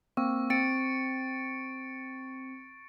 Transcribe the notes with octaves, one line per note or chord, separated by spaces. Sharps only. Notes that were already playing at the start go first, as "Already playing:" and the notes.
A#3 C4 C#6 E6
C4 A6 C#7 D7